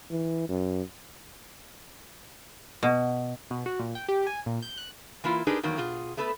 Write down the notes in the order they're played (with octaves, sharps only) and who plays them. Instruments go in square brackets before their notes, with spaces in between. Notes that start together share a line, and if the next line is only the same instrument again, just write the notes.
[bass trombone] E3
F#2
[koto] B2
[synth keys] B2
F#4
A#2
G5
G4
G#5
A#2
G6
F#6
[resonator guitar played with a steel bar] E3 A#3 E4 F4
D4 D#4 G4 G#4 A#4 B4
E2 D#3 F#3 A#3
B2 F4 G#4
A3 B3 A4 B4